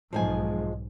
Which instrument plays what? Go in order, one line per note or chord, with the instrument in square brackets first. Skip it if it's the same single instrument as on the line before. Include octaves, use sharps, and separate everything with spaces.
[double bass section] B1 G#2 [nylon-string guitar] F3 G#3 G#5